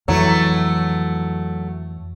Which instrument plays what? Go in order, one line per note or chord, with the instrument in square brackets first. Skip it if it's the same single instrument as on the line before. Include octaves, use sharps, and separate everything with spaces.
[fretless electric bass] F2 E3 [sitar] F#3 A3